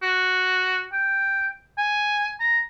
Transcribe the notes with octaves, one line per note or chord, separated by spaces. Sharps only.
F#4
G5
G#5
A#5